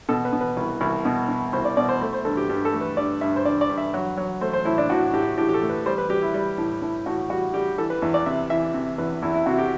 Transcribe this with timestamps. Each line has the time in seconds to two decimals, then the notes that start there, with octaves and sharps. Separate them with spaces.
0.09 B2 A4
0.25 B4
0.33 B2
0.41 B4
0.57 C2
0.81 C2
1.05 B2
1.29 B2
1.53 C2 C5
1.65 D5
1.77 B2 D5
1.89 C5
2.01 A3 C5
2.13 C5
2.25 G2 A4
2.37 G4
2.49 G2 G4
2.65 A4
2.73 A3
2.81 B4
2.97 G2 D5
3.21 G2 E5
3.36 C5
3.45 G2 D5
3.61 D5
3.69 G2
3.78 E5
3.94 F#3
4.17 F#3
4.41 A3 C5
4.53 C5
4.65 A2 E4
4.78 D4
4.90 A2 F#4
5.13 A2 G4
5.38 A2 G4
5.49 G4
5.54 A4
5.62 A3
5.69 B4
5.86 G3 C5
5.98 B4
6.10 G3 G4
6.22 E4
6.34 G3
6.58 A2
6.82 A2 E4
7.06 A2 F#4
7.30 G3 F#4
7.54 G3 G4
7.78 E3 A4
7.90 B4
8.02 E2 E5
8.14 D5
8.26 C3 E5
8.50 E3 E5
8.74 C3
8.98 E2 B4
9.22 E2 E4
9.34 E4
9.46 C3 F#4
9.58 G4